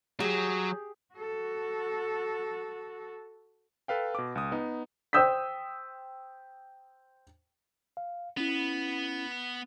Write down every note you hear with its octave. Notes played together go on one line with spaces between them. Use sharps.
F#3 G4 G#4
F#4 A4
A4 B4 F5 G5
B2 D6
C#2 D#6
B3 D#4
C5 G5 D#6 E6 G6 B6
F5
B3 C#4 E4